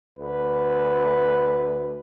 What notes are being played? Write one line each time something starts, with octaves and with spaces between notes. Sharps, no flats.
D2 B4